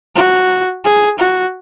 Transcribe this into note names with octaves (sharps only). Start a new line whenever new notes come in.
F#4
G#4
F#4